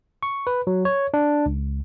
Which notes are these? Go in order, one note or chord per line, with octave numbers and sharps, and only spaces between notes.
C#6
B4
F#3
C#5
D4
C#2